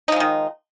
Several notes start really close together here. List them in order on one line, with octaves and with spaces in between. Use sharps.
D#4 F3 G#3 D#3